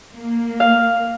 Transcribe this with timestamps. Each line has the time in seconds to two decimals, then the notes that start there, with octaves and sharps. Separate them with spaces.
0.15 A#3
0.60 F5